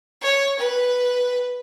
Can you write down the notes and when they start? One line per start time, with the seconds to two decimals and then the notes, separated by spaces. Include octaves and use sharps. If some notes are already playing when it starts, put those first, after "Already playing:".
0.21 C#5
0.58 B4